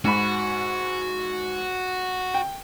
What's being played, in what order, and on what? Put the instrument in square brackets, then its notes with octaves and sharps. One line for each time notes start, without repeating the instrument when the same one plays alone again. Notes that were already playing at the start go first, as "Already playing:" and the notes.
[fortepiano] G#2 B5 [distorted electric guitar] F#4
[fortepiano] G5